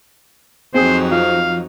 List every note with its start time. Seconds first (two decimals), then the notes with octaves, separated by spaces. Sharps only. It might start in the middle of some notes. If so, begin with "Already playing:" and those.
0.74 F2 F#3 C4 D#4 G#4 C5 D#6
1.12 F3 F4 F5